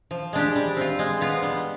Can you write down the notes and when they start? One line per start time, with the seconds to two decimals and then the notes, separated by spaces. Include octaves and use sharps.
0.11 F3
0.33 G#3 D4 G4
0.56 G3
0.77 C4 F4
0.99 G#3
1.21 B3 F4
1.42 G3